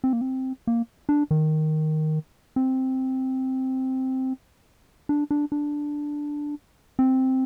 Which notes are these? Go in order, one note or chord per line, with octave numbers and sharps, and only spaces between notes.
C4
A#3
C4
A#3
D4
D#3
C4
D4
D4
D4
C4